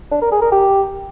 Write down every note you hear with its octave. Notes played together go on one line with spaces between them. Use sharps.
D4
A#4
G#4
A#4
G4